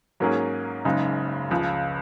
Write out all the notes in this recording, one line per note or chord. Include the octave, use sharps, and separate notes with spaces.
G#2 F#3 A#3 C#4 G#4
F#1 F#2 C#3 G#3 D#4
C#2 C#3 F3